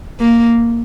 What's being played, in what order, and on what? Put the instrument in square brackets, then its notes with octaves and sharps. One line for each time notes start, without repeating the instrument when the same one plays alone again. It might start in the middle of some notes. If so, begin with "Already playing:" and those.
[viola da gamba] A#3